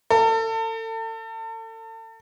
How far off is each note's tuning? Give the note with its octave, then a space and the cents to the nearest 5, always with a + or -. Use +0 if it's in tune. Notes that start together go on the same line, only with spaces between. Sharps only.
A4 +35